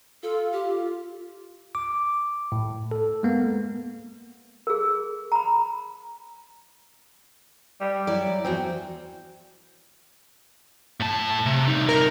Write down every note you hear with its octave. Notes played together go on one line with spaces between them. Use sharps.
F4 A4
G4
D6
A2
A4
G#3 A#3 B3
G#4 A#4
A#5 B5
G3
F#3 E4 D5
E2 F#3 C4 F#4
A2 A5
C3
C2 D#4
A#4